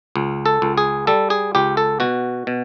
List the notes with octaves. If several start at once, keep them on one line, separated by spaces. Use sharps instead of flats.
C#2
A4
C#2
G#4
G3 A4
G#4
C#2 G4
A4
B2 F#4
B2